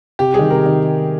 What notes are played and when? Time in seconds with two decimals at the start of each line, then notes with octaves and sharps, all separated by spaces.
0.19 C3 G4
0.34 D#3 G3 G#4
0.51 C3 A#4
0.66 D#3